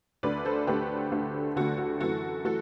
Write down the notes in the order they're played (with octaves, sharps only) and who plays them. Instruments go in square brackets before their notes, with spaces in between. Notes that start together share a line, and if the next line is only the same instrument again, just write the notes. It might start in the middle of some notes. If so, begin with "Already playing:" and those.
[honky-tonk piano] D2 D3 A3 B4 D5
A4 C5
D2 D3 A3 G4 B4
D2 D3 A3
D2 D3 A3 F#4 A4
F#4
F#2 E3 A3 F#4 A4
E3 A3 F#4 A4